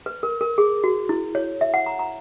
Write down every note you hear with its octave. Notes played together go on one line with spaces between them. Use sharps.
B4
A#4
A#4
G#4
F#4
E4
C#5
E5
F#5
A#5
A#5